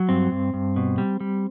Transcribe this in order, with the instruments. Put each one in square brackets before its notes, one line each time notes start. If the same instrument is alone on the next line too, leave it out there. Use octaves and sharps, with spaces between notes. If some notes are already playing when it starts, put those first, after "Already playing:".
Already playing: [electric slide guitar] F#3
G2 C4
G2
G2
B2
G3
G3